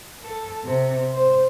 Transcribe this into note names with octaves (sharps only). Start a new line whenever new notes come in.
A4
C3
C5